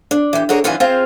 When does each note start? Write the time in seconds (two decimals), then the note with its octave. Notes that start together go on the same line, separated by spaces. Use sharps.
0.11 D4
0.33 E3 G4
0.49 D3 F#4 G#4 A#4 C#5
0.64 F#2 D#3 E3 F4 F#4 G#5
0.80 C4 F4 G#4 C5 F5